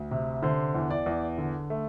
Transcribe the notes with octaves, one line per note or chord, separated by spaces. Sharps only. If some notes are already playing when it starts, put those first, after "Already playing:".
Already playing: D2
C3
D3 C5
E2
D5
E2
D3
A3